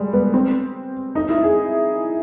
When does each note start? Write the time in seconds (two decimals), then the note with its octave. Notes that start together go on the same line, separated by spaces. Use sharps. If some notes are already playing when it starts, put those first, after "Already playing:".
Already playing: G3 G#3
0.13 B3
0.34 C4
1.15 D#4
1.29 E4
1.44 G#4